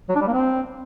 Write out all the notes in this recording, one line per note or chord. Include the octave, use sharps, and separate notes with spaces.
F#3
D4
G3
A#3
C4